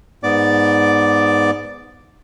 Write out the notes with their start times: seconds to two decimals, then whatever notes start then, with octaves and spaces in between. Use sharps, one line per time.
0.23 G#2 B3 D5 D6